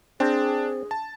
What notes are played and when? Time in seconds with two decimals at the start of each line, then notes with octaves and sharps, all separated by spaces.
0.20 C4 D4 G#4
0.91 A5